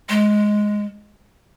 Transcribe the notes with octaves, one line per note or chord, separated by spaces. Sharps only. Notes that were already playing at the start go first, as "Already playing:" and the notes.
G#3